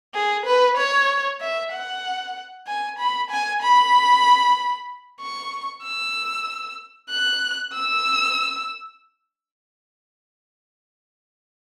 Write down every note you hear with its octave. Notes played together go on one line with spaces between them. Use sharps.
G#4
B4
C#5
E5
F#5
G#5
B5
G#5
B5
C#6
E6
F#6
E6